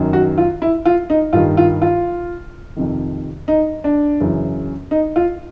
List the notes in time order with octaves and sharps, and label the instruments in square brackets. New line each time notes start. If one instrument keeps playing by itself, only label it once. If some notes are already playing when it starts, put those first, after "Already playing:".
Already playing: [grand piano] F#2 D#3
F#4
F4
E4
F4
D#4
G2 D#3 F4
F4
F4
F2 C3 D#3
D#4
D4
F#2 C#3 E3
D#4
F4